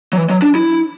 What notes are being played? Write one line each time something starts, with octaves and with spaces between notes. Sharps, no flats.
F#3
E3
F#3
D4
E4